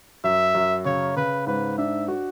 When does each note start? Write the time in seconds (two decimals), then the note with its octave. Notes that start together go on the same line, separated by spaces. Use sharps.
0.24 F#2 E5
0.55 F#2
0.85 C#3 C#5
1.17 C#3 B4
1.47 G#2 B4
1.78 D4 E5
2.08 F#4